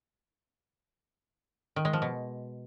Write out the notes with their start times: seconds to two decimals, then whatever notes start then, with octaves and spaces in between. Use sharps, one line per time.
1.76 D#3
1.85 G#3
1.93 F3
2.02 B2